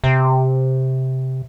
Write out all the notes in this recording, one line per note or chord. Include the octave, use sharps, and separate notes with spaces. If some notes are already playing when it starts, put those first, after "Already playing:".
C3